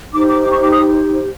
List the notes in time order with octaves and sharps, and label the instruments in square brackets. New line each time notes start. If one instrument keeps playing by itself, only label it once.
[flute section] D#4 G4 C5 D6
D6
D6
C#6
D6
D#6